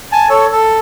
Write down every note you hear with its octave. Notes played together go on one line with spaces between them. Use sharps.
G#5 A5
A4 C#5
A4